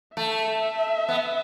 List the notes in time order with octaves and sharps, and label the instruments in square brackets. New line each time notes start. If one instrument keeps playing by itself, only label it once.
[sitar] A3 [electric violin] E5
[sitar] B3